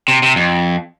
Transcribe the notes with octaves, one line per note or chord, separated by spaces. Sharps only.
C3
C3
F2